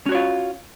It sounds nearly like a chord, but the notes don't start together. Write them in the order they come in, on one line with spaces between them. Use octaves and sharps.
C#4 F#4 C#5 F4